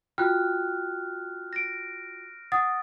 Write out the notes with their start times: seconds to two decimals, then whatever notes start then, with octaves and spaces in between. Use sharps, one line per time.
0.18 F4 F#4 G5 F6 F#6
1.53 A#6 D7
2.52 F#5 D#6 A6